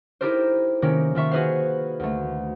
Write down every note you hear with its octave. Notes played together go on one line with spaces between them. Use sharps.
D#4 E4 G4 A4 A#4 C5
C3 D#3 A#3 C#4
D#3 F4 E5 C#6
F#4 G#4 B4 C5 F5
D2 A3